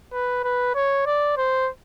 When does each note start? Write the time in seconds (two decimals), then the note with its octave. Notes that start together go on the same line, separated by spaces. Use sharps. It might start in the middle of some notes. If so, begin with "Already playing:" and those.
0.13 B4
0.44 B4
0.75 C#5
1.06 D5
1.37 C5